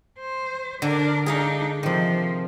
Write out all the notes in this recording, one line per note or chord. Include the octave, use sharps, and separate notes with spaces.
C5
D3 D4 A#4
D4 D#4 G#4 F5 A#5
C3 D#3 F3